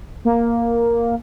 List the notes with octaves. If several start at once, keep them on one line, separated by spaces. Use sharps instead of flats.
A#3